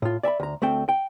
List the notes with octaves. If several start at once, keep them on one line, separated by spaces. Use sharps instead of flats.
A2 F4
D5 E5 A5 B5
D2 A#5
D2 A3 C4 G5
G5